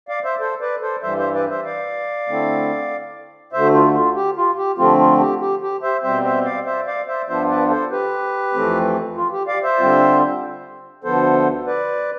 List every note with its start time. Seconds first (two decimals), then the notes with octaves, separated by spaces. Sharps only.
0.08 D5 F5
0.24 C5 E5
0.40 A4 C5
0.61 B4 D5
0.81 A4 C5
1.03 G2 E3 G3 C5 E5
1.18 C5 E5
1.34 B4 D5
1.49 C5 E5
1.65 D5 F5
2.28 D3 A3 C4 E4
3.53 D2 D3 A3 C5 E5
3.74 F4
3.95 F4
4.16 G4
4.36 F4
4.57 G4
4.78 D3 F3 A3 C4 F4
4.99 F4
5.20 G4
5.41 G4
5.62 G4
5.82 C5 E5
6.03 B2 G3 C4 C5 E5
6.24 C5 E5
6.45 D5 F5
6.65 C5 E5
6.87 D5 F5
7.07 C5 E5
7.28 G2 F3 B3 D4 F4 C5 E5
7.49 B4 D5
7.70 A4 C5
7.91 G4 B4
8.54 F2 E3 A3 C4
9.17 F4
9.32 G4
9.48 D5 F5
9.63 C5 E5
9.79 D3 G3 C4 F4
11.04 D2 D3 F3 B3 A4 C5
11.66 B4 D5